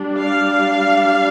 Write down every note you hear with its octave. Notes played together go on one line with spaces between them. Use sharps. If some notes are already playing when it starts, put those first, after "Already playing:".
Already playing: G3 D4
F5